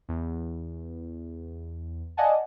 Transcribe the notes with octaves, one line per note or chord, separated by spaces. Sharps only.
E2
D5 D#5 F5 F#5 G#5 A5